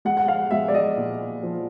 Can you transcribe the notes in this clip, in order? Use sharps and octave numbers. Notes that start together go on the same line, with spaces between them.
G#3 F#5
F#5
F5
G#3 E5
D5
D#5
A#2
F3